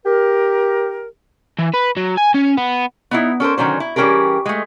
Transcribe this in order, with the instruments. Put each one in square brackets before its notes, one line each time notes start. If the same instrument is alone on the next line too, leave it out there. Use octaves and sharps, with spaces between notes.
[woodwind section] G4 A#4
[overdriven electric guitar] E3
B4
F#3
G#5
C#4
B3
[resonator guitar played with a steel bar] B3 D#4 E4
C#4 A4 A#4 C5
D3 D#3 F#3 C#4 C5
E4
E3 G3 C#4 G4 G#4 A#4
G#3 A3